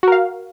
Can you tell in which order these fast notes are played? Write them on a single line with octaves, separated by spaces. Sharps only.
F#4 A#4 F5